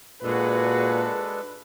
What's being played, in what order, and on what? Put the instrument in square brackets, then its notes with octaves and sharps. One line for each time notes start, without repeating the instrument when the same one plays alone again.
[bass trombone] A#2 [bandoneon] G#3 D4 A4 [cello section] F#4 G#4 [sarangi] B4